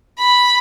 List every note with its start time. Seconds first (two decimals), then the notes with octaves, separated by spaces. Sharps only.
0.18 B5